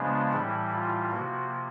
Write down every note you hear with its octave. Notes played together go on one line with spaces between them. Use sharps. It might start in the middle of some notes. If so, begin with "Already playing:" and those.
Already playing: C#3 F3 G#3 B3 D4
A2 E3 G3 E4
F4
C3 F3 A#3 F#4